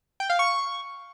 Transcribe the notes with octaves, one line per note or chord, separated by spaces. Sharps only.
G5
F5
C#6